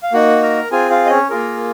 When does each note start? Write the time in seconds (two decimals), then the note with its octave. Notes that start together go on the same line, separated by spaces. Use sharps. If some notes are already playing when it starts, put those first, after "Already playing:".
0.03 F5
0.13 A#3 D#4 F#4 F#5
0.42 A#4 A#5
0.72 C4 F4 G#4 G#5
0.90 F4 F5
1.06 D#5
1.10 C#4 C#5
1.30 A#3 F4 G#4 A#4